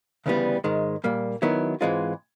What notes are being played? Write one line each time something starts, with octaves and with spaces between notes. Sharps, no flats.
D2 C#3 E3 G3 B3
G#2 D#3 G#3
A#2 G3 A#3
D#3 F#3 B3 E4
G#2 E3 G#3 C4 F4